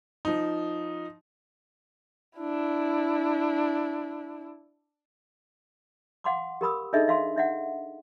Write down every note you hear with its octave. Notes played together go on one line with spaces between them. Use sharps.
F3 D#4
D4 E4
F5 F#5 C6 D6
G4 A#4 B5 D#6 E6
D4 D#4 G#4 A4 D#5 E5
E5 F5 C6
D4 E5 F#5